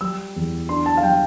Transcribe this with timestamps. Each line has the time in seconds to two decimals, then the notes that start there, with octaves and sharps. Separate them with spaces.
0.01 G3 E6
0.36 E2
0.69 D4 C6
0.86 A5
0.97 F5
1.03 G3 G5